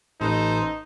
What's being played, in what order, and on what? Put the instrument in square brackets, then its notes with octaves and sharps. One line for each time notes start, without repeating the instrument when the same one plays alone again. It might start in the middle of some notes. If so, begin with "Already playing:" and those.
[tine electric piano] A1 B4 [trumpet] D#4 [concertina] A4 C5